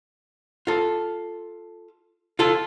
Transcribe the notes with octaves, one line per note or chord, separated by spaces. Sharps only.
F4 A4
F4 A4